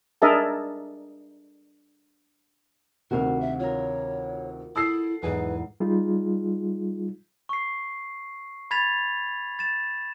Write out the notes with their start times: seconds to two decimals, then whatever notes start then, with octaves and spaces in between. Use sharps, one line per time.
0.22 D4 G#4 A#4 D#5 E5 A5
3.11 D2 C3 D#3 F#4 A#4 F5
3.41 E5
3.59 F4 A#4 C#5
4.76 E4 A4 D#6 E6 C7
5.22 E2 G#2 D#4 G#4 B4
5.80 G3 D#4 F4 G#4
7.49 C#6 C7
8.71 B5 G#6 A6 B6 F7
9.59 A6 E7